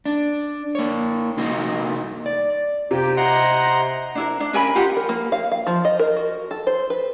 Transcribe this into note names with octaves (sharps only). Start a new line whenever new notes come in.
D4
A#3 C#5
C2 A#3 D#4 F#4 D#5
D5
C3 A#3 D#4 G4
E4 C5 D#5 F#5 A#5 C6
D4 E4 A#4
D4
C#4 A#4 G#5 B5
F4 G4 A#4 F#5
A#4
A#3
F5
F5
F3
D#5
A#4
F#4
A4
C5
B4